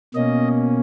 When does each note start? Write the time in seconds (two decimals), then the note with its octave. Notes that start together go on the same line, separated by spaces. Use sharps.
0.15 B2 A#3 C#4 D#5